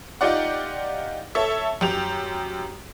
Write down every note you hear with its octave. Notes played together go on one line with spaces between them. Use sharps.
D#4 F4 G4 D5 F#5
A4 C#5 E5
F#2 G4 F7